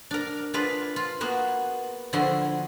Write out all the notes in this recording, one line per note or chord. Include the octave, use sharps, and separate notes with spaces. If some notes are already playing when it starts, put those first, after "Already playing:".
D4 A#4
D4 F4 G#4 B4
F4
A#3 B3 F#4 G#4
D3 F3 E4 F#4 G#4 C6